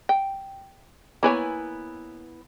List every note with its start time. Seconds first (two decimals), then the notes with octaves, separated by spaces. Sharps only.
0.09 G5
1.23 A#3 B3 E4 B4 C#5 G#5